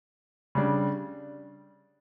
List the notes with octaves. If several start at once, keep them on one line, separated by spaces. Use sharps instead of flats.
C#3 G3 D4